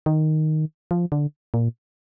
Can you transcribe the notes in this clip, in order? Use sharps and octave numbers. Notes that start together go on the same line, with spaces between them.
D#3
F3
D3
A#2